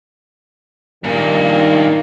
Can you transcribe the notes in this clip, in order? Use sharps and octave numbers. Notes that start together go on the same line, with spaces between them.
G2 A#2 D#3 G3 A#3 D#4